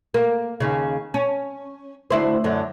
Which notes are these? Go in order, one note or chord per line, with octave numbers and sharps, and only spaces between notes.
A#3
D#2 C#3
C#4
D2 E4 C5
F#2 D3